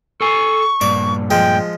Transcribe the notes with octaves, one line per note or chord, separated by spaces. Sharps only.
A4 G#5 C#6
G2 A#2 D5
F3 G#3 G5